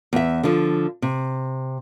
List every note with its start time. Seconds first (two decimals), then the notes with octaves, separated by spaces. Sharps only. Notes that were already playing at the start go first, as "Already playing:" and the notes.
0.13 E2 E5
0.43 D3 F3
1.02 C3